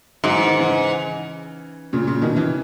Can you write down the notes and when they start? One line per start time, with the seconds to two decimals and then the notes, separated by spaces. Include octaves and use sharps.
0.24 G#2 F#3
0.35 E3
0.47 D#3
0.59 C#3 E3
1.93 A#2 C#3
2.07 A#2 C#3
2.21 B2 D#3
2.36 C#3 E3